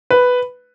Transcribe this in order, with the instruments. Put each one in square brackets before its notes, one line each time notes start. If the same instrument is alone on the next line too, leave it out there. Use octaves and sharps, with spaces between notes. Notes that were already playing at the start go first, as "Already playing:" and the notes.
[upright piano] B4